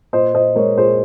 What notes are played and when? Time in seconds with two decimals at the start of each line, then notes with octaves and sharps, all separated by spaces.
0.13 A#2 C5 D#5
0.34 A#2 C5 D#5
0.55 G#3 A#4 C#5
0.77 A#2 G#4 C5